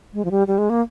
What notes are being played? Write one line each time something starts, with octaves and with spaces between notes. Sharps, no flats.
G#3
F3
G3
G3
G#3
A#3